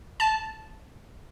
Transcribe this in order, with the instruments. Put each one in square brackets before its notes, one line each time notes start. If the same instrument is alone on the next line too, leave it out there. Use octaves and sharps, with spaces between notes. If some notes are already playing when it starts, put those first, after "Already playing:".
[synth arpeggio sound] A5